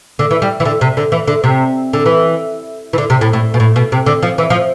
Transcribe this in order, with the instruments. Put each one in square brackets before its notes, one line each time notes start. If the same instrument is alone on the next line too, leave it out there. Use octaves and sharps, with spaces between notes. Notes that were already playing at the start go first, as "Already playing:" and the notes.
[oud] D3
E3
G3
E3
D3
C3
D3
E3
D3
C3
D3
E3
E3
D3
C3
A2
A2
B2
A2
B2
C3
D3
F3
E3
F3